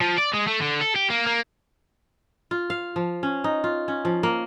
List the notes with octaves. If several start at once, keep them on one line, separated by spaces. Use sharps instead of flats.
F3
D5
G#3
A3
D3
A4
G4
A#3
A#3
F4
F5
F3
C#4
D#4
F4
C#4
F3
A#3